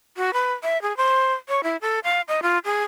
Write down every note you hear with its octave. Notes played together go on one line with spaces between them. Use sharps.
F#4
B4
E5
G#4
C5
C#5
E4
A4
F5
D#5
F4
G#4